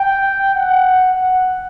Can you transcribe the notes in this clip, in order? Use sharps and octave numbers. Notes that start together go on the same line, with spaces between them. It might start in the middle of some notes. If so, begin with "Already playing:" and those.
Already playing: G5
F#5